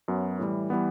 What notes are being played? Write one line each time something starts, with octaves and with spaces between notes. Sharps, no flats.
F#2 F#3 B3
A2 E3 G3
E3 G3 B3